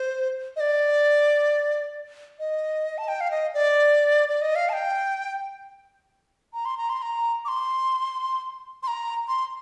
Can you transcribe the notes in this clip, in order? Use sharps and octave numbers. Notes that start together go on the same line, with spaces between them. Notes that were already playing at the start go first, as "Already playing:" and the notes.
Already playing: C5
D#5
D5
D#5
A5
G5
F5
D#5
D5
D5
D#5
F5
A5
G5
A#5
C6
A#5
C6
A#5
D6
C6
C6
A#5
C6